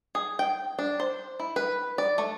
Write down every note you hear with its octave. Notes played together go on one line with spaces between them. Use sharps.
G#4
G5
D4
C5
E4
B4
D5
A3